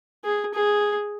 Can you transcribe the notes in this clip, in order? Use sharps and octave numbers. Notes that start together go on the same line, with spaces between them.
G#4
G#4